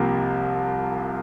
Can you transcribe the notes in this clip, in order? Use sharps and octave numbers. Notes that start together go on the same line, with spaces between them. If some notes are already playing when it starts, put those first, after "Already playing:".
Already playing: C2 C3 F3 A#3